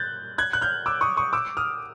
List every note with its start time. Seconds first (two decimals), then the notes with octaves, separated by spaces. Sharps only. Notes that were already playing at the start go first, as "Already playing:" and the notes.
Already playing: F#6 G6 A6
0.38 F#6 G#6
0.53 F#6
0.61 F6 G6
0.86 D6 E6
1.01 C#6 D#6
1.17 C#6 D#6
1.33 D6 E6
1.57 D#6 F6